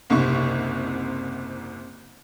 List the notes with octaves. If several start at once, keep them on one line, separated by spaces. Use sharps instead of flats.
F#1 C2 G#2 C3 C#6